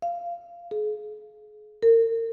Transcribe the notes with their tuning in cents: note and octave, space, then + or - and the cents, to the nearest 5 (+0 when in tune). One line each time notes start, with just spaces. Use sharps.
F5 -15
G#4 +35
A#4 -35